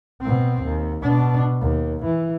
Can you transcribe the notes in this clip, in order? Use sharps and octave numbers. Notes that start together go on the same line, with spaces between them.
B2 C4
D#2
B2 D4
D#2
E3